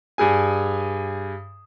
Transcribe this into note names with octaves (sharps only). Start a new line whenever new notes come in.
G2 G#4 G#5